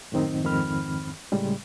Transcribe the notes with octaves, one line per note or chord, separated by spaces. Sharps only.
F#2 A2 D#3 C4 D#4
F2 G#2 D#3 C4 B5 F6
A2 C#3 G3 G#3